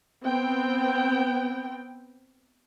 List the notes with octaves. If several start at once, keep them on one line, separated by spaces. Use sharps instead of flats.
B3 C4 G5